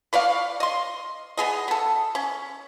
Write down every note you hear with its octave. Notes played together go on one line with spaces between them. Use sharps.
B4 C#5 D5 F5
D#5 C6
B3 G#4 D#5
B3 A4
C#4